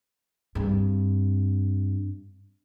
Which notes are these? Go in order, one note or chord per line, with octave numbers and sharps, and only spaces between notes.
G2 C4